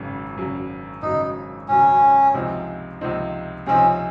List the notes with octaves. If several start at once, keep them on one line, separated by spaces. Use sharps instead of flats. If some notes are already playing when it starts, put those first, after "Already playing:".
Already playing: G#1 F#2 C#3 F#3
G#1 F#2 C#3 F#3
G#1 F#2 C#3 F#3 D#4
G#1 F#2 C#3 F#3 C#4
C#2 C3 F3 C4 D#4
C#2 C3 F3 C4 D#4
C#2 C3 F3 C4 C#4 D#4